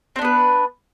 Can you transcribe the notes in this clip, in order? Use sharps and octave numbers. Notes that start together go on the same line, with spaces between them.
B3 C4 D4 B4